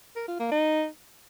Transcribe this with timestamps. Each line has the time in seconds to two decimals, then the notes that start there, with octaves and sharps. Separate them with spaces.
0.16 A#4
0.28 F4
0.40 A#3
0.52 D#4